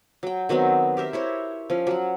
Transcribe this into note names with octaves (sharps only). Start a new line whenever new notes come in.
F#3 G5
D#3 F#3 B3 C4
G4 A#4 C5 E5
E4 C5 C#5
F3 C#4
F#3 F#5